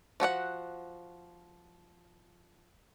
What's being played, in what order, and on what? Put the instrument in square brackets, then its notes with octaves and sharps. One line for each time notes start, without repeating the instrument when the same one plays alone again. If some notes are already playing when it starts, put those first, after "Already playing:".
[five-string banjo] F3 F#4 A4 F#5